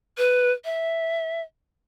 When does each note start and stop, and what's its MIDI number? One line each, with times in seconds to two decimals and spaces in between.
0.18 0.52 71
0.65 1.41 76